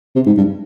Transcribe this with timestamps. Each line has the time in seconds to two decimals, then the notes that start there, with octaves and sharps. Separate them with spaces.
0.16 C3
0.26 G#2
0.38 G2